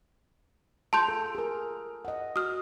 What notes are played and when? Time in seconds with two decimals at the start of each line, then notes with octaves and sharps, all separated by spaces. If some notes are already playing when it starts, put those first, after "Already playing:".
0.93 F4 G#4 A5 C6 G6
1.08 A4
1.35 G#4 A#4
2.05 D#5 F#5
2.36 F#4 D#6 F6